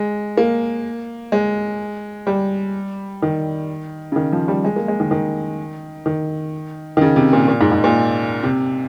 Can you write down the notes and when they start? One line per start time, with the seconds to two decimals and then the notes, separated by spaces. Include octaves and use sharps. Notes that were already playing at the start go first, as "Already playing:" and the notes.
Already playing: G#3
0.37 A#3
1.32 G#3
2.27 G3
3.22 D#3
4.12 C#3
4.16 D#3
4.32 F3
4.48 G3
4.65 G#3
4.76 A#3
4.88 G#3
5.00 D#3
5.11 D#3
6.06 D#3
6.97 D#3
7.01 C#3
7.16 C3
7.33 A#2
7.48 A#2
7.61 G#2
7.72 G#2
7.84 A#2
8.44 C3